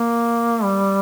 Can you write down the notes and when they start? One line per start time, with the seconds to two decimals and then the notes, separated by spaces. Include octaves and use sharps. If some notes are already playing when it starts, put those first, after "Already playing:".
Already playing: A#3
0.63 G3